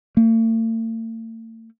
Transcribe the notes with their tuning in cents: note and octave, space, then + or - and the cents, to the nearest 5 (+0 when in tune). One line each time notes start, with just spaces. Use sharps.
A3 +45